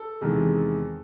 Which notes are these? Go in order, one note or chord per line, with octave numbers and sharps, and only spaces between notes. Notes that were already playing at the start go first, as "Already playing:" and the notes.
Already playing: A4
E2 C3 D#3 G#3